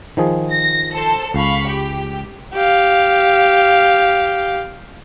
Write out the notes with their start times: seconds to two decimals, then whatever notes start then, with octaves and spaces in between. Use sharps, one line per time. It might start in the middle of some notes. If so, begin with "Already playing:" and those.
0.17 D#3 F3 G#4
0.50 A#6
0.93 A4 C5 A5
1.34 C#2 F5 B5 C#6
1.66 G4
2.54 G4 F5